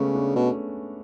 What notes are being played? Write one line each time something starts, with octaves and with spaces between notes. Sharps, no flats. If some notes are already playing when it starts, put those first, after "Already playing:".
Already playing: C#3 G#3 A3 B3 C#4
B3 D4
B2 A3 C#4